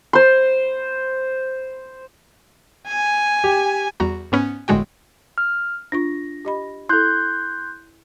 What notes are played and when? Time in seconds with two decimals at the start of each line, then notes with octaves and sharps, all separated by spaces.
0.13 C5 C6
2.88 G#5
3.44 G4
4.00 E2 G3 F#4 A#5
4.32 G#2 B3 C#4
4.68 G1 A2 D3 G#3 F#4 G5
5.38 F6
5.92 D4 F4 C#6 A#6
6.45 G4 D#5 B5
6.89 E4 A4 C6 F#6 G6